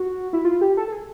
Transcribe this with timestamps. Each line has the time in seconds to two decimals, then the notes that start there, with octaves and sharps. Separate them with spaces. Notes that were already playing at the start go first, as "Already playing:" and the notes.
Already playing: F#4
0.33 E4
0.45 F4
0.61 G4
0.77 A4
0.88 A4
0.92 G#4